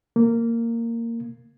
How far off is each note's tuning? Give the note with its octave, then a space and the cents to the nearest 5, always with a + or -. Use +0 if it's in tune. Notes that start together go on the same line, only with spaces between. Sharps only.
A#3 -15